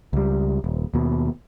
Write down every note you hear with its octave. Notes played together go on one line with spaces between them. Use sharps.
C#2 G3
D#1
D#2 B2